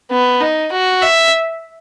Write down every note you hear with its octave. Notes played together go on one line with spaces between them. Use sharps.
B3
D#4
F#4
E5